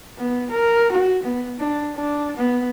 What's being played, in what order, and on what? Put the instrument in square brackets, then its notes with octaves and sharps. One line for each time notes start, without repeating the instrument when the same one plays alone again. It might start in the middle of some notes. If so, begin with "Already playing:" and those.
[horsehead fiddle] B3
A#4
F#4
B3
D4
D4
B3